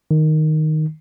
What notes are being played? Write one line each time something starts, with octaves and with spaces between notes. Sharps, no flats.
D#3